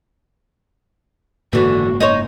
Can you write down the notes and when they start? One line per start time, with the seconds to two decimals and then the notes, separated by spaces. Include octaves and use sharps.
1.53 F#1 G#2 D3 E3 A#3 F#4
2.00 D#4 C5 C#5